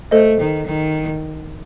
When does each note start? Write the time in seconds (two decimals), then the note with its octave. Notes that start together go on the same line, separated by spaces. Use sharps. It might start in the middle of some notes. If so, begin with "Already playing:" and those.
0.11 A3 A4 C5 D#5
0.40 D#3
0.68 D#3